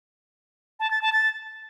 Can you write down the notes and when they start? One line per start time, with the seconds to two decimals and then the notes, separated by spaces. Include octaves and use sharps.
0.80 A5
0.91 A6
1.02 A5
1.13 A6